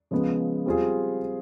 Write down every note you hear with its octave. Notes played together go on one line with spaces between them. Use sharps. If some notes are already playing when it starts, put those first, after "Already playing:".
C#3 F3 G#3 B3
G3 C4 F4 G#4